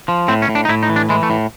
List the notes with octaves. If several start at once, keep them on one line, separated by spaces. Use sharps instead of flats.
F3
A2 C4
C#4
A2
D4
D#4
A2 E4
D#4
E3
D4
E3 G#3
A3
A2